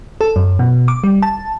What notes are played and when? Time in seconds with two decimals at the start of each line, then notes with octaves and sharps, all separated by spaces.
0.21 A4
0.36 F#2
0.59 B2
0.88 D6
1.04 G3
1.22 A5